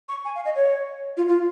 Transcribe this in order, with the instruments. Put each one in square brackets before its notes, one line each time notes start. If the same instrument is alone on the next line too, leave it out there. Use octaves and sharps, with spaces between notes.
[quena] C#6
G#5
F5
D#5
C#5
F4
F4